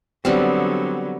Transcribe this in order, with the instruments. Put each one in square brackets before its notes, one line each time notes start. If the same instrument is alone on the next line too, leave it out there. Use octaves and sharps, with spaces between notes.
[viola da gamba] D3 F#3 [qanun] G3 B3 C4